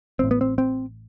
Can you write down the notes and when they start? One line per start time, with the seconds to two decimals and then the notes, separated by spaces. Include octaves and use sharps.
0.19 A1 A2 C4
0.31 B3
0.41 C4
0.58 C4